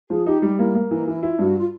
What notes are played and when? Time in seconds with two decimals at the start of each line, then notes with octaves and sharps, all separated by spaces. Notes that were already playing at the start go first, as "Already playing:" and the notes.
0.10 F3 G#4
0.26 D#4 G4
0.42 G3 G4
0.59 A#3 E4
0.75 A#3
0.91 E3 D#4
1.07 E3 E4
1.22 E4 F4
1.39 G2 F#4
1.58 F4